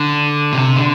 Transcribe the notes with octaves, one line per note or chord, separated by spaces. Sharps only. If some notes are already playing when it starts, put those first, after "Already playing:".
Already playing: D3
C3
D3